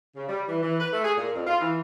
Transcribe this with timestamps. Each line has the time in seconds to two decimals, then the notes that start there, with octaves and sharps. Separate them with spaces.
0.16 C#3
0.29 G3
0.49 E3
0.63 E3
0.80 B4
0.93 A3
1.05 G#4
1.17 A#2
1.35 F2
1.47 F4
1.61 E3